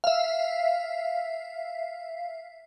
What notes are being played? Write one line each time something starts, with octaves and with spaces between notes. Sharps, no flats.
E5 F5